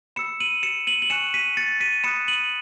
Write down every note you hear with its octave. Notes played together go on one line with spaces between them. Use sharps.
B5 E6 C#7 E7
D#7 F#7
C#7 E7
D#7 F#7
F#7
G#5 C#6 F#6 C#7 E7
B6 D#7
A6 C#7
B6 D#7
B5 D#6 F#6 C#7 E7
D#7 F#7